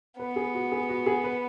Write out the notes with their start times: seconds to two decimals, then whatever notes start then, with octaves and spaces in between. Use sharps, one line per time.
0.19 B3 B4
0.36 G#4
0.54 F#4
0.72 G#4
0.89 F#4
1.06 G#4
1.24 B4